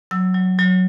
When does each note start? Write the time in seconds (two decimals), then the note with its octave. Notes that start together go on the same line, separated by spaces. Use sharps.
0.11 F#3 E6
0.34 F#3
0.58 F#3